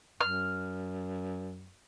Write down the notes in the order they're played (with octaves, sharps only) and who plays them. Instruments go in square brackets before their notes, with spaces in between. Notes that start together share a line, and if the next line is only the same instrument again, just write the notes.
[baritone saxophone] F#2 [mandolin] F6